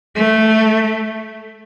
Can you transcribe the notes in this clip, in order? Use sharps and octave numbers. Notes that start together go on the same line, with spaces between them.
A3